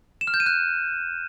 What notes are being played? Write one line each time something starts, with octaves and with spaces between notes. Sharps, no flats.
E7
F6
G6
D#7
F#6